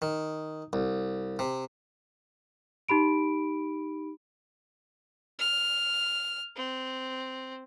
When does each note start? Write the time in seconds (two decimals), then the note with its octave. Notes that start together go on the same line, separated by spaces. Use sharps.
0.02 D#3
0.73 C2
1.39 C3
2.89 D#4 G4 B5 D7
5.39 F6
6.56 C4